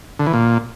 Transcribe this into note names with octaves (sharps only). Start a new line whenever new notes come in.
D3
E3
A#2